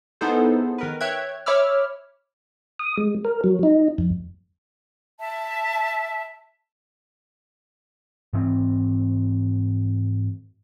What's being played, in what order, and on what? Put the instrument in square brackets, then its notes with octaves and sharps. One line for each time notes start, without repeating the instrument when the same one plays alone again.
[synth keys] B3 D#4 E4 G#4 A4 C5
D#3 A#4 B4
C#5 E5 G5 F#6 G#6
C#5 E5 B5 D6 E6 F6
[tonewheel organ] D#6
G#3
A#4
F#3
D#4
F2
[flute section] E5 A5
[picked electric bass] G#2 E3 C4